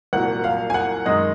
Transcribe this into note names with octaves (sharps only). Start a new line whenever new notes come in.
C2 A#2 F#3 F#5
F5
G#5
F#5
F#2 D#3 G#3 D#5